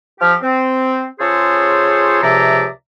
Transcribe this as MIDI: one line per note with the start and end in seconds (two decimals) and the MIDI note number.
0.21 0.35 53
0.21 0.35 67
0.21 0.35 89
0.42 1.05 60
1.20 2.20 49
1.20 2.20 65
1.20 2.20 68
1.20 2.20 69
1.20 2.20 72
1.20 2.20 73
2.23 2.66 37
2.23 2.66 48
2.23 2.66 53
2.23 2.66 74
2.23 2.66 76
2.23 2.66 82